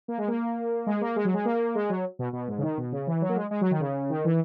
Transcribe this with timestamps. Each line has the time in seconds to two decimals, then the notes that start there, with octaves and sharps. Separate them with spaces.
0.08 A#3
0.18 G#3
0.28 A#3
0.86 G#3
1.01 A#3
1.16 G#3
1.25 F#3
1.34 G#3
1.45 A#3
1.75 G#3
1.90 F#3
2.19 B2
2.33 B2
2.48 G#2
2.58 C#3
2.63 D#3
2.78 B2
2.92 C#3
3.07 E3
3.22 F#3
3.29 A#3
3.36 G#3
3.51 G#3
3.61 F#3
3.71 D#3
3.80 C#3
4.10 D#3
4.25 E3